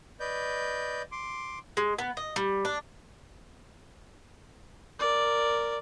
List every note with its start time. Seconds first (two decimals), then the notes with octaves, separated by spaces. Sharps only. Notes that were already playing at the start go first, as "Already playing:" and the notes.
0.20 B4 D5 D#5 G6
1.12 C6 D6
1.77 G#3
1.99 B3
2.17 D#5
2.36 G3
2.65 D4
4.99 A#4 D5